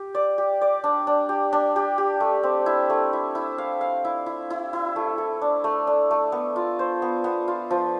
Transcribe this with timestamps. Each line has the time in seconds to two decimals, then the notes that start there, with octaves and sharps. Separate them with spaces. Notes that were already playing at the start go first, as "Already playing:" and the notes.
Already playing: G4
0.15 D5
0.38 G4
0.61 D5
0.84 D4
1.07 D4
1.29 G4
1.53 D4
1.76 G4
1.98 G4
2.20 A3
2.43 C4
2.66 E4
2.90 A3
3.13 E4
3.35 E4
3.58 F5
3.81 F5
4.05 E4
4.26 E4
4.50 E4
4.73 E4
4.96 A3
5.18 A4
5.42 D4
5.64 A3
5.87 D4
6.11 A3
6.32 B3
6.56 F4
6.79 C5
7.02 B3
7.24 B3
7.48 F4
7.71 F3